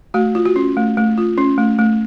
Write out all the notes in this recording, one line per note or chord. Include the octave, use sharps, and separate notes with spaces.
A3 F#4
F4
F#4
C#4
A3
A3
F4
C#4
A3
A3